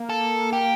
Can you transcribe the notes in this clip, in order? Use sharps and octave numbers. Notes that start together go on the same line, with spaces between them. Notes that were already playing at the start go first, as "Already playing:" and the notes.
Already playing: A#3
A4
G4